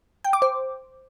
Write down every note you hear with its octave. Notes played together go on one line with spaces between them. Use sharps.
G5
D6
C5